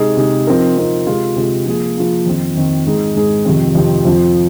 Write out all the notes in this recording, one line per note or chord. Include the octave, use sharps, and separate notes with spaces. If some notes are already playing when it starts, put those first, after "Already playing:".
Already playing: C3 G#3 D#4 G#4
C3 G#3 D#4 G#4
F3 C4 D#4 A#4
F3 C4 D#4 A#4
C3 G#3 F4
C3 G#3 F4
F3 A#3 G#4
F3 A#3 G#4
F2 D#3 C4
F2 D#3 C4
G#2 G#3 D#4 G#4
G#2 G#3 D#4 G#4
F2 C3 D#3 C4
F2 C3 D#3 C4
F2 F3 C4